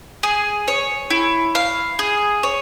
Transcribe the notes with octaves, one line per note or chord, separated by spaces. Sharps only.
G#4
C#5
E4
F5
G#4
C#5